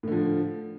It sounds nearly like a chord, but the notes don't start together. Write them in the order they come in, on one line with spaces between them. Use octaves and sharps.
A2 D3 F3